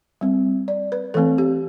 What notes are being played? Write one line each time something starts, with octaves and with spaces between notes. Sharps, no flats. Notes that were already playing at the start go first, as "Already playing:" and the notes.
G3 C4
D5
B4
E3 A3 C4 A4
G4